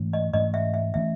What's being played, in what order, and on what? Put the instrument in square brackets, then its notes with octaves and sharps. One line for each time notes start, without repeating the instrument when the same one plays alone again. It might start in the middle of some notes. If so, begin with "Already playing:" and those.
Already playing: [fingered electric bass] G#2 E3 A3 C#4
[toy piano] D#5
[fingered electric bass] G#2 E3 A3 C#4 [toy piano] D#5
[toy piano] E5
E5
[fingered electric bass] E3 A3 C#4 [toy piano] E5